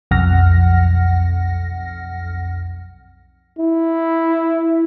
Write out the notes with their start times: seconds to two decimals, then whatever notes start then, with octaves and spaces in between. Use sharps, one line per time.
0.11 B1 F2 F#5 F6 A#6
3.58 E4